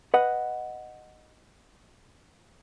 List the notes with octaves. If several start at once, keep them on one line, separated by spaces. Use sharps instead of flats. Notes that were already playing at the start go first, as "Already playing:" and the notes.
B4 D#5 F#5